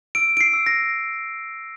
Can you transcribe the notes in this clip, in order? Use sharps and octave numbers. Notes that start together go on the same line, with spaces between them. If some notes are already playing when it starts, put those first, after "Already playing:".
E6 D7
D7
C7
E6
A#6